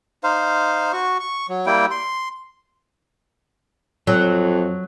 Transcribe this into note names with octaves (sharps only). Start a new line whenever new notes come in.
D#4 C5 F5
F#4 C#6
C#6
F#3
G3 A#3 E4 G5
C6
F2 F#3